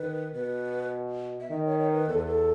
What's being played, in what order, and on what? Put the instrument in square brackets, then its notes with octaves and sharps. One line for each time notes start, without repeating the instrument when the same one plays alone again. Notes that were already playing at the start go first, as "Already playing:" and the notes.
Already playing: [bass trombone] D#3 [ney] B4
[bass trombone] B2 [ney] B4
[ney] E5
[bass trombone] D#3 [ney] D#5
[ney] C#5
C#5
B4
[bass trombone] E2 [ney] A4
[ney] B4
A4